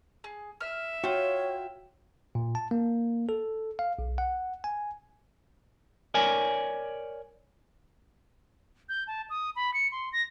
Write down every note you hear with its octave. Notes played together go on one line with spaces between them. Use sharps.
G#4
E5 F6
F4 F#4 C#5 G5
A#2
A5
A#3
A4
F5
B1
F#5
G#5
A#4 C#5 D5 G#5
G6
A5
D#6
B5
C#7
C6
A#6